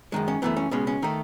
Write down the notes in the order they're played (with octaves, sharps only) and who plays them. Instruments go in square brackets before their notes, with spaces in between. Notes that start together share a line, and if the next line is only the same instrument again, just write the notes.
[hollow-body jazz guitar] F#2 D#3 G#3
C#4
F#2 E3 A3 B3
C#4
C#2 B2 G#3 C#4
C#4
D#3 A3 D#4